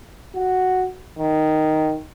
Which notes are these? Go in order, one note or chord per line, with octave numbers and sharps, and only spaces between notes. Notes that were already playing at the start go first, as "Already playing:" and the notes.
F#4
D#3